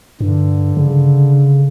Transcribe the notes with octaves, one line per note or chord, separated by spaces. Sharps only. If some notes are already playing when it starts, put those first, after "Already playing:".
G2 D3
C#3